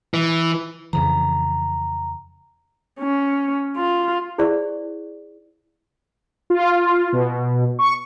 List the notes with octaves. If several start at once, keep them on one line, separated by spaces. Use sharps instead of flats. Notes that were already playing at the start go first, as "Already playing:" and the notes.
E3
F2 C#3 E3 A#5
C#4
F4
E4 G#4 C5 D5 F5 C#6
F4
B2
C#6